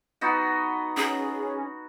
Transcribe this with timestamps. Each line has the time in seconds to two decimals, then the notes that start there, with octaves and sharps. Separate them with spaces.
0.21 B3 D#4 F#4
0.97 C#4 G#4